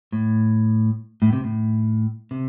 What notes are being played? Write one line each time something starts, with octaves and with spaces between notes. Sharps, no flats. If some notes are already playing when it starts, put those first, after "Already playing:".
A2
A2
C3
A2
C3